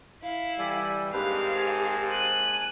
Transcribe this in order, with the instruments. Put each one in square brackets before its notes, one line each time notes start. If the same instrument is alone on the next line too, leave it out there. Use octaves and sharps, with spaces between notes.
[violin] E4 [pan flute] F5
[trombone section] E3 G3 [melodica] A4 D5 G#5
[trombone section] G#2 A#3 C4 [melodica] D4 B4 C5 [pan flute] G4 [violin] F5
[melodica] G#5 A5
[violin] F#6 D#7